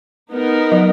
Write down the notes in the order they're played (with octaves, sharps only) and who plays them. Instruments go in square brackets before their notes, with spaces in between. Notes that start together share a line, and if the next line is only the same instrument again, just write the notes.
[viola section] B3 D#4 A#4
[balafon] F#3